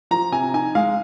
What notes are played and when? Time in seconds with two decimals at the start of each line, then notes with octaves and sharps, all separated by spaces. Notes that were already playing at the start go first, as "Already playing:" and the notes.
0.11 F3 A#5
0.32 C3 G#5
0.54 D#4 G#5
0.75 G#3 F5